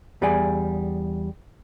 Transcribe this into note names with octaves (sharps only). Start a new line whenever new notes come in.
E2 G3 B3 G#4 D5 G#5